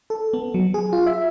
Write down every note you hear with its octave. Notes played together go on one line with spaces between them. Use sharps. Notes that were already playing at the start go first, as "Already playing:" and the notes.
A4
B3
F#3
G#4
F4
E5